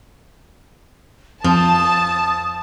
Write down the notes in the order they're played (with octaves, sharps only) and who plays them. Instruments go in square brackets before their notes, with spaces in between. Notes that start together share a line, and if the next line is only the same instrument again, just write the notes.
[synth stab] F2 [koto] F3 [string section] A5 [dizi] D#6